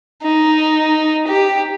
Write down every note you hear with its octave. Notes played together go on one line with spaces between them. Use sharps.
D#4
G4